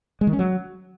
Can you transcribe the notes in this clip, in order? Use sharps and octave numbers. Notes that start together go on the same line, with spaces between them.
G#3
D#3
C#4
F#3